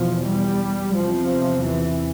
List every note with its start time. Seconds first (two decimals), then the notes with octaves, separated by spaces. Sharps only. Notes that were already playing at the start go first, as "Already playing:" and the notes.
Already playing: E2 B2 F3
0.28 G3
0.96 E2 C3 F3
1.64 E3